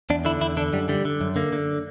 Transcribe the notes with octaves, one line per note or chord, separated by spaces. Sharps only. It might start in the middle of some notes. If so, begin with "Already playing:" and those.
E2 D4
D3 E4
E2 E4
D3 D4
F#2 G3
D3 G3
D3
F#2
D3 A#3
D3